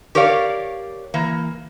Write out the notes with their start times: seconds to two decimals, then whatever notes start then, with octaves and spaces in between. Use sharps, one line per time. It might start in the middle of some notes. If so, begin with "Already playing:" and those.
0.15 G4 A#4 C#5 D5 F5
1.14 E3 A#3